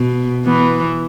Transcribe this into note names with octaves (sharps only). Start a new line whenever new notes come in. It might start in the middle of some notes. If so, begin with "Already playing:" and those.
Already playing: B2
E3 B3